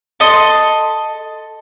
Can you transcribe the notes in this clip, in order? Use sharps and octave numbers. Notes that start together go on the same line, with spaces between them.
A4 D#5 C6